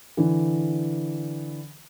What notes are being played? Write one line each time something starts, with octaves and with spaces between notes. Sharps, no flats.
D3 E3